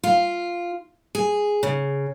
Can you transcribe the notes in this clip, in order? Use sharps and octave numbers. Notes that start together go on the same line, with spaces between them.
F4
G#4
C#3